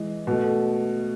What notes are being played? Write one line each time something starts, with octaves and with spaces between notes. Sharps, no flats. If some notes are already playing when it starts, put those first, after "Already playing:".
Already playing: E3 G#3
B2 A3